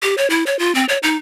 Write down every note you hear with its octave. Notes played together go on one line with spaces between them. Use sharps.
G4
C#5
E4
C#5
F4
C4
C#5
D#4